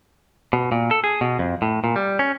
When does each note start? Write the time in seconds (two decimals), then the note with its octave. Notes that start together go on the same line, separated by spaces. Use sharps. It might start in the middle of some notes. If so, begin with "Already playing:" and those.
0.53 B2
0.72 A#2
0.91 A4
1.04 G#4
1.21 B2
1.39 F2
1.62 A2
1.84 A#2
1.96 G3
2.19 C#4